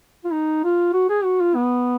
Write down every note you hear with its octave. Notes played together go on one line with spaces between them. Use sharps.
F4
D#4
F4
F#4
G#4
F#4
F4
B3